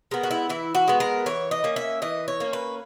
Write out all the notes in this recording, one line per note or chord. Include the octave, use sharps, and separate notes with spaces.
G#3 B3 A#4
F#4
E4
E3 E4
F#4
G#3 B3
A#4
E3 C#5
D#5
A#3 C#4
E5
E3 D#5
C#5
A#3 C#4
B4